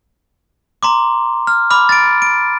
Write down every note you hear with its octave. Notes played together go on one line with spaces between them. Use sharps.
A#5 C6 D6
F6
B5 D6 F6
A6 D7
D7